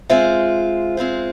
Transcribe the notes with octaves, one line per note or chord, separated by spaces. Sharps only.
G#3 C4 F4 C5 E5
G#3 C4 F4 C5